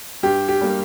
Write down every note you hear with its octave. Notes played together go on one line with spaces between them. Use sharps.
G2 G4
G4
G3 A#3